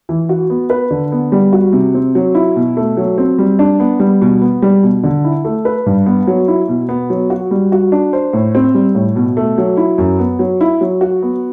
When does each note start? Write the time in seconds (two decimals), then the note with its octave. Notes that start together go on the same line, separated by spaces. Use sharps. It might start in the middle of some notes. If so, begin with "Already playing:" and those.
0.09 E3
0.29 F#4
0.50 B3
0.70 B4
0.90 D3
1.12 B3
1.32 G3
1.53 F#4
1.73 C3
1.94 C4
2.15 F#3
2.35 E4
2.56 B2
2.77 A3
2.97 F#3
3.18 C4
3.38 G3
3.59 D4
3.80 B3
4.00 G3
4.21 B2
4.42 B3
4.62 G3
4.83 B2
5.04 D3
5.24 E4
5.45 A3
5.65 B4
5.86 G2
6.06 B3
6.27 F#3
6.48 E4
6.68 B2
6.89 B3
7.10 F#3
7.30 F#4
7.51 G3
7.72 F#4
7.92 D4
8.13 C5
8.33 A2
8.55 C4
8.75 G3
8.95 A2
9.16 B2
9.37 A3
9.58 F#3
9.77 E4
9.98 F#2
10.19 B3
10.39 F#3
10.61 E4
10.81 F#3
11.01 F#4
11.22 B3